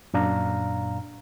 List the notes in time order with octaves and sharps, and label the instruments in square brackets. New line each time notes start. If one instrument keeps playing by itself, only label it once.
[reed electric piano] F#2 A#2 D4 F5 A#5